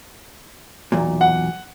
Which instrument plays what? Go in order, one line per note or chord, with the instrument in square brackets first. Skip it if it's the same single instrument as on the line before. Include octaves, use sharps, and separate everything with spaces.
[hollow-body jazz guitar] B1 E2 A#2
[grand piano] F#5